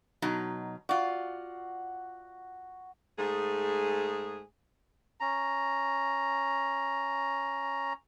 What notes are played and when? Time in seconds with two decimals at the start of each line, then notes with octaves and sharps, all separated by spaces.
0.22 B2 F#3 D#4
0.89 F4 F#4 D5
3.19 G#2 A3 G#4
5.20 C#4 A#5